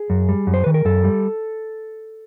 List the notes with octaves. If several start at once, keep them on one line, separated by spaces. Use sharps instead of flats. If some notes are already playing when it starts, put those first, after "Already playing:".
Already playing: G#4
F#2
G3
F#2
C5
D#3 B4
A#4
F#2 A4
G3